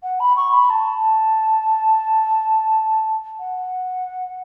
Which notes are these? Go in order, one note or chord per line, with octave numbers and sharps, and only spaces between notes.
F#5
B5
C#6
B5
A5
F#5